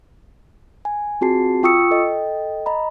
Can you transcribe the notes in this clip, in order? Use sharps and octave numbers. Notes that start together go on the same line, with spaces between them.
G#5
C4 F4 F#4 G#4 A5 C7
F4 G5 C#6 D#6 E6 C#7
A4 D#5 G5
D#5 A#5 B5